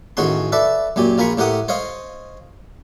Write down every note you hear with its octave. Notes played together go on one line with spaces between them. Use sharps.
A1 D#3 C#4 F#4 G#4 C6
A4 B4 D5 E5
F#2 A#2 G4 G#5
A#1 F4 A#4 G#5 B5 C#6
A2 G4 A#4 F#5 D#6
C5 C#5 D#5 F5